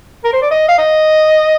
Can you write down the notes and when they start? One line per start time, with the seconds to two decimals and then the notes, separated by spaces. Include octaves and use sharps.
0.24 A#4
0.33 C5
0.42 D5
0.51 D#5
0.68 F5
0.78 D#5